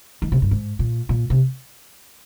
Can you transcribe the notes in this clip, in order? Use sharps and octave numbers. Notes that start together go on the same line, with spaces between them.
D#3
C3
G2
G#2
A#2
A#2
C3